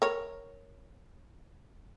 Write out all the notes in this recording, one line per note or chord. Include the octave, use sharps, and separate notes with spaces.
A#4 C#5